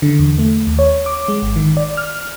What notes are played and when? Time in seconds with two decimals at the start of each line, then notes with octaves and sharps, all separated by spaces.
0.02 D3
0.19 E2
0.39 A3
0.67 D#2
0.79 C#5
1.06 D6
1.28 G#3
1.43 G#1
1.56 D#3
1.77 D5
1.97 F6